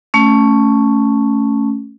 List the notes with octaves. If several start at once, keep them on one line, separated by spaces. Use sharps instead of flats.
A3 C#4